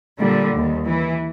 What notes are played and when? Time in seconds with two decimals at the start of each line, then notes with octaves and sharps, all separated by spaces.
0.19 A#2 D3 G3
0.56 D#2
0.87 E3